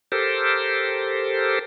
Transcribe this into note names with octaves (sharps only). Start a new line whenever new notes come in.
G4 A4 A#4 C5